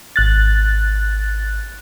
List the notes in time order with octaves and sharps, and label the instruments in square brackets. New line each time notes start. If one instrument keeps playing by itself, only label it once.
[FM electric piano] G#1 F#6 A6